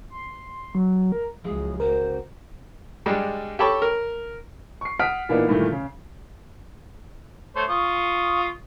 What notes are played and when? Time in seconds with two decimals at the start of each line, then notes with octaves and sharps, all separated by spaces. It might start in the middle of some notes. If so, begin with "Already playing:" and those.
0.10 C6
0.75 F#3
1.12 A#4
1.45 C#2 F3 F#3 G#3 E4 G#4
1.80 C#3 F#4 A#4 C5
3.06 G2 G3 G#3 D4
3.59 G4 A4 C#5 A5 B5 C#6
3.82 A#4
4.81 C#6 C7
4.99 F#5 D#6 F6 B6 D7
5.29 A#2 E3 A#3 B3 D4 D#4
5.48 G2 A#2 D#3 E3 A3
5.72 C#3
7.56 A3 C5 C#5
7.69 F4 C#6 D#6